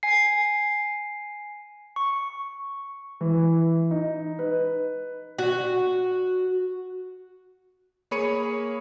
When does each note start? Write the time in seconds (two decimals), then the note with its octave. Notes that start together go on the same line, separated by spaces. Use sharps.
0.03 G#5 C7
1.96 C#6
3.21 E3
3.91 D#4
4.39 B4
5.38 F#4
8.11 A#3 G#4 C#5 B5 C#7 D#7